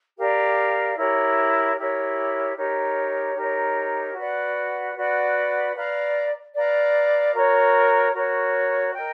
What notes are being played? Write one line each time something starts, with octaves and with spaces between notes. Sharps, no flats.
G4 A#4 D5 F5
E4 G4 A#4 C#5
E4 G4 A#4 C#5
D#4 G4 A#4 C#5
D#4 G4 A#4 C#5
F#4 B4 D5 F#5
F#4 B4 D5 F#5
B4 D5 F5 A#5
B4 D5 F5 A#5
F#4 A#4 C#5
F#4 A#4 C#5
A#4 D#5 G5